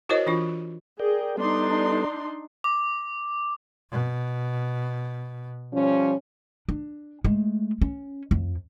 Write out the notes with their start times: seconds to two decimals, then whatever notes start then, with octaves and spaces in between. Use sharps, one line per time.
0.09 E4 F#4 A#4 C5 C#5 D#5
0.26 E3 D4 F4
1.00 G#4 A#4 D5 G5
1.37 G3 B3 D4 D#4 A4 C6
2.64 D6
3.91 B2
5.72 F3 G3 C#4
6.69 D4
7.24 G#3 A3
7.81 C#4
8.31 F2